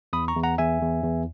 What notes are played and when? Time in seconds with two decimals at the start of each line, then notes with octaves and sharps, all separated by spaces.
0.13 E2 B5 D#6
0.28 A#5 C#6
0.36 E2
0.43 F#5 A#5
0.58 E2 E5 G#5
0.81 E2
1.04 E2